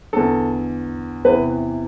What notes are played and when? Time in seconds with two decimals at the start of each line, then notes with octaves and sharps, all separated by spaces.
0.13 E2 D3 A4
1.25 E2 C3 E3 B4